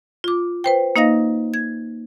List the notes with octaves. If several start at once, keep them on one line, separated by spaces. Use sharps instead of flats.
F4 D6
B4 C5 G5
A#3 D#4 D#5 F5 A#6
G#6